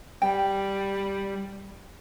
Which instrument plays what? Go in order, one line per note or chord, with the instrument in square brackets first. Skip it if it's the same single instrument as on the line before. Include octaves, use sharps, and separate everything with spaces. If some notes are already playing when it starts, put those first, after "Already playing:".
[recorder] G3 [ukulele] G5